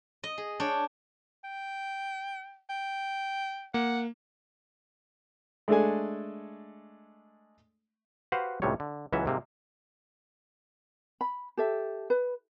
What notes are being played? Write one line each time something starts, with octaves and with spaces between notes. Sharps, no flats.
D#5
G#4
D4 C#5 G5
G5
G5
A#3 F#5
G#3 A3 D4 A4 G#5
F#4 G4 B4 C5 F5 F#5
C#2 A2 C3 G3 C#5
D3
C#2 E3 F#3 C#4 E5
G#2 C3 A#3
B5
G4 A4 E5
B4